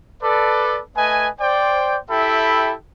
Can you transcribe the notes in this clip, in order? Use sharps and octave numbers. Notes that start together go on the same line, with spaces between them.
A4 B4 D5
A3 B4 D#5 G#5
C5 D5 G5
E4 G4 A4 E5 G5 B5